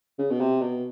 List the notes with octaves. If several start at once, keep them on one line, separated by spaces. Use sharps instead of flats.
C#3
B2
C3
B2